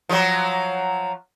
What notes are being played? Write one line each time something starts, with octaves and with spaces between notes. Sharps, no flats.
F3 F#3